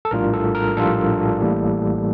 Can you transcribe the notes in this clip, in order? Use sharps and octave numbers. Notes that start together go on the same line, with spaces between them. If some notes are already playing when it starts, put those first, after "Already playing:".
A4
A#1 A2 G3 D4 F4 A#4
A4
A#4
A#1 A2 G3 D4 F4 A4
A1 A2 E3 G3 A#3